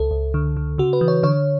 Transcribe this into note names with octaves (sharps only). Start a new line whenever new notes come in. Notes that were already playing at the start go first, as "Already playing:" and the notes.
Already playing: C#2 A4
C#2
D3
D3
C#3 F#4
B4
E3
C#5
D3 C#5